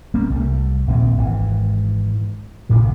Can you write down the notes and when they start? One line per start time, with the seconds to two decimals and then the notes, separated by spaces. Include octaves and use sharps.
0.14 G3 A#3 C4 C#4
0.30 C2 G3 A3
0.87 A#1 D#2 C4
1.18 G#1 G#2 E3
2.69 D1 A#1 A2 C3